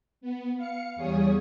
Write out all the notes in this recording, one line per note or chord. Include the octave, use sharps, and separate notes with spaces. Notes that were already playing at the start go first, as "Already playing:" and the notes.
B3
F5 C#7
E2 G3 G#4 C#5 D#6